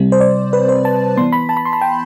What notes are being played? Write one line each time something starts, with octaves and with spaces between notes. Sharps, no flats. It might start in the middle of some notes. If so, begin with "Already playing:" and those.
Already playing: C3 G3 C4
C5
D5
B4
C5
A5
E3 B3 C6
B5
A5
B5
C6
B5
G5